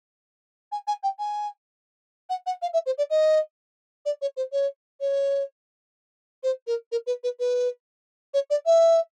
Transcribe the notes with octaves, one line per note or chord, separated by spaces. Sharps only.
G#5
G#5
G5
G#5
F#5
F#5
F5
E5
C5
D5
D#5
D5
C#5
C5
C#5
C#5
C5
A#4
A#4
B4
B4
B4
C#5
D5
E5